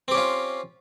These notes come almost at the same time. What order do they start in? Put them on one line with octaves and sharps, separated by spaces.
C4 G4 C#4 F4